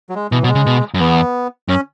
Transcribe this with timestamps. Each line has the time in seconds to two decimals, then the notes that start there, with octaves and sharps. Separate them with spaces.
0.09 F#3
0.15 G#3
0.32 B2 E3
0.42 B2 F#3
0.49 G#3
0.55 C#3
0.66 B2
0.94 F#2
1.00 E2 B3
1.68 F#2 C#4